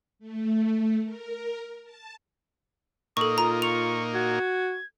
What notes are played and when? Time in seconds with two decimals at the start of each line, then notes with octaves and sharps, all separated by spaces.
0.19 A3
1.04 A#4
1.84 A5
3.17 A#2 A#3 D#4 A4 C#6 D#6
3.38 F4 A#5
3.62 C#6 F7
4.14 F#4 G#6